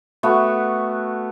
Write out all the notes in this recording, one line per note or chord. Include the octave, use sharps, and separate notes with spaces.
A3 B3 F#4